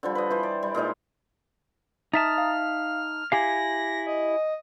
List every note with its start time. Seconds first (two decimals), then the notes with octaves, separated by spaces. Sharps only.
0.03 D3 F3 G3
0.15 B4 D#5
0.31 E3 C5
0.43 D5
0.63 G3
0.74 A#2 G#3 D#4 C5
2.13 D#4 E5 A5 A#5 D#6 F6 A6
2.38 F5
3.32 E4 G4 F5 G#5 A#6
4.07 D#5